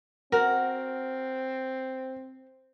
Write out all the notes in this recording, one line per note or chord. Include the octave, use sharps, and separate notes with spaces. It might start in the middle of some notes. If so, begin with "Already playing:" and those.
C4 F#4 A#4 F#5